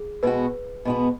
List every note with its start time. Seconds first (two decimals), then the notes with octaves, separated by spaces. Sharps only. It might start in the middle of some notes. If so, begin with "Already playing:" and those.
Already playing: G#4
0.23 B2 G#3 B3 F#4 B4
0.85 B2 G#3 B3 F#4